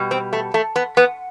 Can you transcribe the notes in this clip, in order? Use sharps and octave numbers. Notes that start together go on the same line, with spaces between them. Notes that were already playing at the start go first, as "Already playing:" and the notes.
Already playing: B2 G3
C4
A3
A3
B3
B3